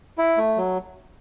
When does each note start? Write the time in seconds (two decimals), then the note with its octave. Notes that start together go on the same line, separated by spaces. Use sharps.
0.18 E4
0.37 A3
0.57 F#3